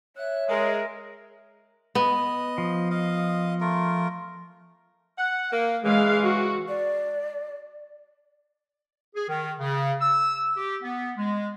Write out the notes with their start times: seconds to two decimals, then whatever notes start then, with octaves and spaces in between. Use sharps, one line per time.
0.16 C#5 E5 F#6
0.49 G#3 A#4
1.95 B3 D#5
2.58 F3
2.91 D#5 F5
3.61 A3 F4 A#4
5.18 F#5
5.52 A#3
5.85 C#3 E3 G#3 F5
6.26 F#4
6.68 D5
9.15 G#4
9.28 D#3
9.59 C#3
10.02 E6
10.57 G4
10.83 B3
11.18 G#3